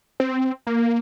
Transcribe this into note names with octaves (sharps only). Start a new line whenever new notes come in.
C4
A#3